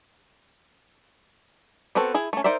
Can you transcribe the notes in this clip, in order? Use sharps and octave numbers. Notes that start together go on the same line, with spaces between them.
B3 C4 F#4 A4
E4 G#4
A3 C#4
D#4 A#4 C5 D5 E5